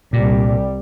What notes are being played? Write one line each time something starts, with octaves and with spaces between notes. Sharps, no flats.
C2 A#2 G3